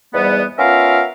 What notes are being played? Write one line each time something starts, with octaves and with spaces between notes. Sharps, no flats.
E2 G#2 G3 B3
B3 C#4 F4 A#4 E5 F5